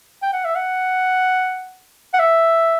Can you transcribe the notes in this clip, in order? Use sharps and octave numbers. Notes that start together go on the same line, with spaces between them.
G5
F#5
E5
F#5
F#5
E5